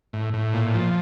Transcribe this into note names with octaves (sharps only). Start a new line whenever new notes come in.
A2
A2
A#2
F3